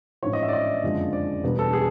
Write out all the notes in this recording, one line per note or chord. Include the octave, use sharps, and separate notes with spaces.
A1 G#2 F3 C#5
D#5
E5
D5
D#5
F#1 F2 D3 F3 G#3
D5
E1 E2 B2 G3 B3
A4
G#4